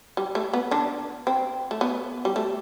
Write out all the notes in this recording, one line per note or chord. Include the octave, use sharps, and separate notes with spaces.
G3
A3
B3
D3 D4
C4
A3
B3
G3
A3